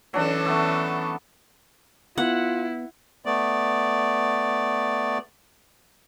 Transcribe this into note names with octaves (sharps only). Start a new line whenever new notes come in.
E3 F#3 C#4 D4 A4
A3 B3
B3 E4 F4 F#5
A3 B3 D5